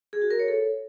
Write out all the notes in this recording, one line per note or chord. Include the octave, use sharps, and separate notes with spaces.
G#4
F#4
A#4
C#5
A4